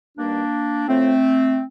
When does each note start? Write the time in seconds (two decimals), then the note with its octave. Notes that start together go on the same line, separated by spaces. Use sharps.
0.17 G2 D#3 G3 A#3 D4
0.88 A2 F3 A3 C4